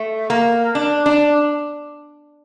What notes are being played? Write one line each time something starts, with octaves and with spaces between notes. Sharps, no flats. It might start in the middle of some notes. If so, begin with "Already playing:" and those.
Already playing: A3
A#3
D4
D4